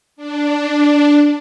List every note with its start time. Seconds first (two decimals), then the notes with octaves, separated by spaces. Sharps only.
0.16 D4